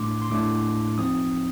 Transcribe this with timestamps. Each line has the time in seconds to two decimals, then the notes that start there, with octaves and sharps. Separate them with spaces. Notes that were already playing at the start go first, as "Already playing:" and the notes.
Already playing: A2 A3 D4 C6 D6
0.22 C6
0.31 A2 A3 D4 D6
0.98 F3 C4 D#4 D#6